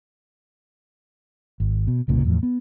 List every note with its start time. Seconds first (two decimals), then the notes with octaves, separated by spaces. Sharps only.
1.60 G#1
1.87 B2
2.08 F#1 C2 A#2 C#3
2.25 E2 A2 F3
2.43 B3